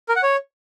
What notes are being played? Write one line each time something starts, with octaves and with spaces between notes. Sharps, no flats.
A#4
F#5
C#5